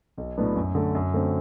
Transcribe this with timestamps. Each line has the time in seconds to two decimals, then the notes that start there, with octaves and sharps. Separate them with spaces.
0.18 B1
0.37 A2 F#3 B3 D4
0.56 F#2
0.75 D3 A3
0.95 F#2
1.14 D3 A3 C4